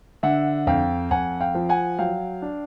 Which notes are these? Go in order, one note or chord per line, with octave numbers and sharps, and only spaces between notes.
D3 E5 F#5
F2 F5 G5
F2 F#5 G#5
F5 G5
F3
F#5 G#5
F#3 F5 G5
D4